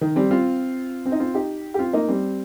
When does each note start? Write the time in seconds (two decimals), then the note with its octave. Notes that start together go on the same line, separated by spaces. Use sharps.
0.01 D#3
0.16 G3 C4
0.31 C4 F4
1.05 C4
1.12 D#4
1.19 C4 F4
1.34 D#4 G4
1.74 G4
1.79 C4 F4
1.93 A#3 D#4
2.08 G3 C4